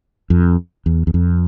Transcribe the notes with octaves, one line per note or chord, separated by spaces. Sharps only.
F2
E2
E2
F2